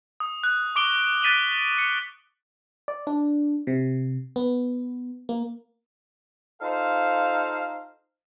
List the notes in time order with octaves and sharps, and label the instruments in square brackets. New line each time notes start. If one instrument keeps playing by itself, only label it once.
[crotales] D#6
F#6
C#6 D6 D7 G7
F#6 A6 B6 D#7 F#7
C#7
[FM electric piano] D5
D4
C3
B3
A#3
[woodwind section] D#4 F4 A4 C5 F5